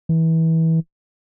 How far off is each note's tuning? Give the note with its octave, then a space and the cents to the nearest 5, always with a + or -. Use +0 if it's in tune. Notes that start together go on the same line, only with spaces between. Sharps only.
E3 -25